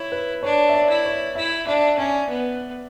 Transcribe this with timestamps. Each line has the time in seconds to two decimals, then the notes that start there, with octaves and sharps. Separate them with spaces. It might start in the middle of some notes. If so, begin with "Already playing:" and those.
Already playing: E4 C#5
0.12 B4
0.43 D4 C#5
0.69 E5
0.74 D5
0.89 E4
1.05 C#5
1.35 E4 E5
1.67 D4 E5
1.97 C#4 D5
2.29 B3